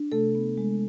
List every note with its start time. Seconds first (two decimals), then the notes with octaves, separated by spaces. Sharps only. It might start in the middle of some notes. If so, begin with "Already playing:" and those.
Already playing: D4
0.12 C3 A3 A4
0.35 B3
0.58 G#3